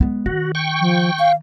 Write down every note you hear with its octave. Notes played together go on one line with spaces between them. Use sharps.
G#3 B3
D#3 F#4
G5 C#6
F3
F5